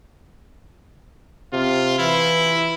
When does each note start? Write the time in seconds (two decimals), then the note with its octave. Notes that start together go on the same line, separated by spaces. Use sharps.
1.53 C3 F4
1.99 E3 E4